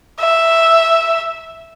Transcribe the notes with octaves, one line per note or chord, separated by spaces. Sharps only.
E5